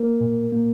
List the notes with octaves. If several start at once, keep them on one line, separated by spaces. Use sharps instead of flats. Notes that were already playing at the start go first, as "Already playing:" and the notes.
Already playing: A#3 A#4
A#2
A#3